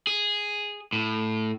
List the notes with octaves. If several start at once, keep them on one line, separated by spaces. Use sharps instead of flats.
G#4
A2